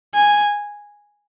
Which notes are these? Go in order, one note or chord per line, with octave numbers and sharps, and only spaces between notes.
G#5